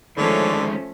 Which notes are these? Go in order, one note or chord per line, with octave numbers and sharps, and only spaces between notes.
D3 D#3 F3 G#3 A3 C#4